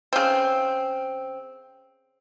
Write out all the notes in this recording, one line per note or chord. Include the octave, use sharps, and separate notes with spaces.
C#3 C4